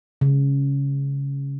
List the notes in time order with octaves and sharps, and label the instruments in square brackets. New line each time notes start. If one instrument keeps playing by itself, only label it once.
[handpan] C#3